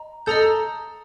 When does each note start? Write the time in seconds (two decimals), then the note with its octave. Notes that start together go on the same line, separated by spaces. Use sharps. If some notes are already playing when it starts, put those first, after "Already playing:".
Already playing: D#5 A#5
0.26 A4 D#5 A#5 D#6 G6